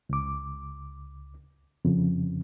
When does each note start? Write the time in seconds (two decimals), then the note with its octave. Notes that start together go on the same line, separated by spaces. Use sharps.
0.09 C#2 D6
1.85 F2 C#3